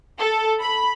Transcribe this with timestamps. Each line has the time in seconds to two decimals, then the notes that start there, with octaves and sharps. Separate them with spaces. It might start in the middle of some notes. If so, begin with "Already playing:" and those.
0.19 A4
0.61 B5